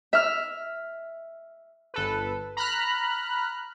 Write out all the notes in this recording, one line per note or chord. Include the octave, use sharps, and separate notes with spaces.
E5 F6
G1 A4 B4
A#5 B5 F6 F#6